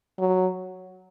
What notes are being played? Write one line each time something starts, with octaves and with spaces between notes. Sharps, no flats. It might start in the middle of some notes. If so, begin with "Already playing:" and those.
F#3